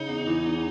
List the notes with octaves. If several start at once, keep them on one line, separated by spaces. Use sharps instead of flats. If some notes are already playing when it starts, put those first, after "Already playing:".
Already playing: C#3 D#4
E2
E3
E2